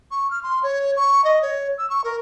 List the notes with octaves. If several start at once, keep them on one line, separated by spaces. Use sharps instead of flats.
C#6
F6
C6
C#5
C#6
D#5
C#5
E6
C#6
A#4